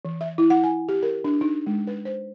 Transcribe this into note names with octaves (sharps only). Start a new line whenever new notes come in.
E3
E5
E4
F#5
G#5
G4
A#4
D4
D#4
G#3
B4
C5